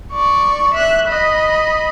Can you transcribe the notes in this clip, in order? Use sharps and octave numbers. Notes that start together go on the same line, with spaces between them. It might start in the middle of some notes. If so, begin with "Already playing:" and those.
D5 C#6
E5 F#6
D#5 B5